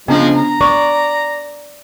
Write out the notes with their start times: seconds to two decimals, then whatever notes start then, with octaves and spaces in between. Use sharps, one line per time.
0.08 C#3 F3 G#3 B3 D4
0.36 A#5
0.61 D5 C#6